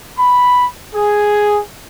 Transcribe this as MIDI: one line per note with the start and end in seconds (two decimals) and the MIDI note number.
0.17 0.65 83
0.93 1.60 68